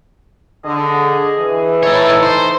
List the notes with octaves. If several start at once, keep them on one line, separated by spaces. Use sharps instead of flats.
D3 G#4 D#5
E3
D#4 E4 A4 C#5
C5